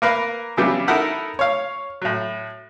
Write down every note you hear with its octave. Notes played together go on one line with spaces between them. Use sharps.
A#3 A#4 B4 F5
C#3 E3 F#3 G3 B3 D4
D#4 E4 A4 A#4 F#5 B5
C#5 F5
A2 F#3